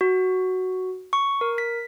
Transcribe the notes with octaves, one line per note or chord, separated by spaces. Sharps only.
F#4
C#6
A#4
B6